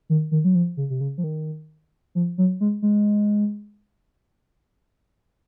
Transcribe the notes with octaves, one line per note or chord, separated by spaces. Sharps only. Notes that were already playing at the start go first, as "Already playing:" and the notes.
D#3
D#3
F#3
F3
C#3
C3
C#3
F3
D#3
F3
F#3
G#3
G#3